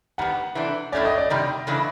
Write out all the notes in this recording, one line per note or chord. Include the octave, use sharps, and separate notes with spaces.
D#3 G3 B3 F#5
C3 E3 A3 D4
A2 F#3 A3 C#4 D5
D#5
D5
C3 D#3 G3
C#3 E3 A3 D4